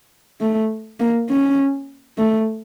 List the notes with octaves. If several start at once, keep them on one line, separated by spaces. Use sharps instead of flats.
A3
A#3
C#4
A3